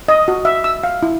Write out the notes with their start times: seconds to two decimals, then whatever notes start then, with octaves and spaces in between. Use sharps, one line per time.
0.08 D#5
0.28 F#4
0.45 E5
0.64 E6
0.84 F5
1.03 E4